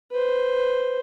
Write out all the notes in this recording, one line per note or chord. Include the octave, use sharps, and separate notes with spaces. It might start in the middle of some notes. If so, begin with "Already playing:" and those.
B4 C5